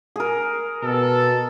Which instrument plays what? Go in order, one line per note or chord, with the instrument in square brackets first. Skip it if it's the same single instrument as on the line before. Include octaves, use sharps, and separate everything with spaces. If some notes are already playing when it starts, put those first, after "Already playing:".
[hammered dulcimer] G#4 A#4
[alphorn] B2 [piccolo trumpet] A4